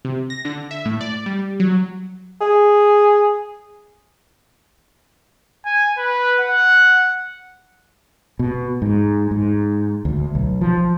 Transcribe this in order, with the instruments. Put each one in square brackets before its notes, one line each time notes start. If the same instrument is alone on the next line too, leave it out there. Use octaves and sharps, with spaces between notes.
[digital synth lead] C3
A#6
D3
E5
A2
D5
G3
F#3
[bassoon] G#4
[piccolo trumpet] G#5
B4
F#5
[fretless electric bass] B2
G#2
G#2
D2
B1
F3